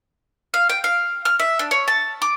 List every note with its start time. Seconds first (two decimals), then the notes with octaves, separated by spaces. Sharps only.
0.54 F5
0.69 G5
0.84 F5
1.25 F6
1.39 E5
1.59 D4
1.71 C#5
1.88 A5
2.22 D6